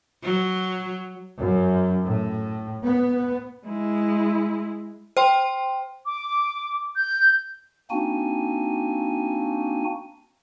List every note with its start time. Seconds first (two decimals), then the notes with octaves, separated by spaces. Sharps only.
0.23 F#3
1.37 F#2
2.04 A2
2.83 B3
3.67 G#3 E4
5.17 C5 G5 C6
6.06 D6
6.96 G6
7.90 A#3 C4 D4 D#4 F#4 G#5